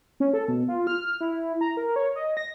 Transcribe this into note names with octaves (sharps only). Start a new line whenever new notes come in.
C#4
A4
B2
F4
F6
E4
A#5
A#4
C#5
D#5
A#6